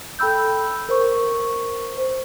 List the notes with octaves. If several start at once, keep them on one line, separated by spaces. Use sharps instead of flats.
A4 G5 B5 E6 G6
A#4 C5 C#6
C5